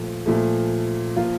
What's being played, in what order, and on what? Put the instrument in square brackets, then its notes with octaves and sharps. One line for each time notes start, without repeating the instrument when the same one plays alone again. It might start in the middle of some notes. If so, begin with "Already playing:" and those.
Already playing: [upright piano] A#2 F3 A3
A#2 F3 A3
F3 A#3 F4